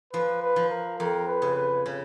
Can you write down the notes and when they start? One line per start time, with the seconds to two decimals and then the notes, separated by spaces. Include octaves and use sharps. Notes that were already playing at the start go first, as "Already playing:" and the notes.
0.13 F3 B4
0.43 B4
0.56 F3
0.70 A#4
0.99 F2 A#4
1.28 B4
1.42 C#3
1.56 B4
1.86 C#3